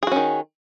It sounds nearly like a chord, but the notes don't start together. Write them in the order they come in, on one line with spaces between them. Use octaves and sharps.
G#4 F#4 C#4 D#3